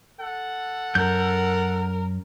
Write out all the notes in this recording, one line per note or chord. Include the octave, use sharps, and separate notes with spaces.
A4 F#5
F#2 A#4 G6